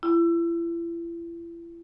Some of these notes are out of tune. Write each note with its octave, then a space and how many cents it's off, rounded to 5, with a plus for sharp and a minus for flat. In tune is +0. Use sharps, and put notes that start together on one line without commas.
E4 +40